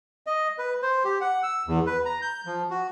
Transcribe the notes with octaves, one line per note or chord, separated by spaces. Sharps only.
D#5
B4
C5
G4
F#5
E6
E2
B4
A#5
G6
F3
F#4